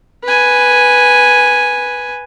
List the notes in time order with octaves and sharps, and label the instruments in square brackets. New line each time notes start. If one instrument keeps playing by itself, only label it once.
[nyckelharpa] B4 G#5